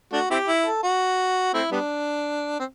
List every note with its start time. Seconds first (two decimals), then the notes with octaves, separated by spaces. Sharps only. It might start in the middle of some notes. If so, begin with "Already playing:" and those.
0.13 A3 D4 F#4
0.30 C4 E4 G4
0.48 E4
0.65 A4
0.83 F#4
1.54 A3 C4 E4
1.71 G3 B3 D4
2.59 C4